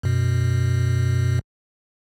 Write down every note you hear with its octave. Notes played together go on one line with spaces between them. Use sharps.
F#2 B2